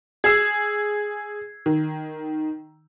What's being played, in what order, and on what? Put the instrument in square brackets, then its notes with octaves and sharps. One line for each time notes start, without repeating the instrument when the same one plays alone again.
[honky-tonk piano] G#4 E6 [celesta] G#6 C7
[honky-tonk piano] D#3